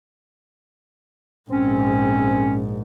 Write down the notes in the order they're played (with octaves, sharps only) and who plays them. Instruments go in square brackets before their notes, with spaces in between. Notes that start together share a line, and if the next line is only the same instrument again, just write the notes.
[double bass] A#1 G#2 [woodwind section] C4 C#4